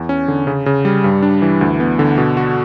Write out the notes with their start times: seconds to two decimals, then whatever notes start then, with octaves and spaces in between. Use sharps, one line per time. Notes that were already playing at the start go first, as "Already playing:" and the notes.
Already playing: E2
0.09 C#4
0.28 D3
0.47 C#3
0.66 C#3
0.85 G3
1.04 G2
1.22 D4
1.42 E3
1.61 D2
1.80 B3
1.99 D3
2.18 B2
2.37 F#4